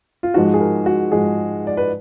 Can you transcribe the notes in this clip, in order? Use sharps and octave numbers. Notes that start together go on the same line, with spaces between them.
F4
G#2 F3 G#3 F#4
G#4
A#4
F#4
G#2 F3 G#3 G#4
D5
B4